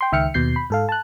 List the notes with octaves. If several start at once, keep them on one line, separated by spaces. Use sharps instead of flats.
G5 C6
C#2 D#3 E5 G5 F6 C#7
D#2 B2 G6 C7
B5
G#2 A4 F5
A5 F#6